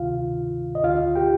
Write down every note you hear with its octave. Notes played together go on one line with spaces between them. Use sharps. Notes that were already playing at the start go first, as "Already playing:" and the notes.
Already playing: D2 C3 D#3 F4 F5
D#5
D2 D3 F4 F5
G4 G5